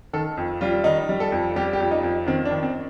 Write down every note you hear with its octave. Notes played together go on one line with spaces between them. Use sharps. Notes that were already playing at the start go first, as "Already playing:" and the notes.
D#3 A4
F2
G3 F4
D#3 D#4
G3
A4
F2
G3 G4
G4
F2
D#4
F2
D#3 C4
D4
D#3
C4